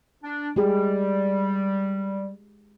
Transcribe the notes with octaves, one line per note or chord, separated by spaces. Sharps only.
D4
G3 G#3 G4 G#4